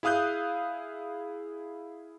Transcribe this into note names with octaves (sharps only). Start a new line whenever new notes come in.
E4 G#4 F5 D#6 F#6 G6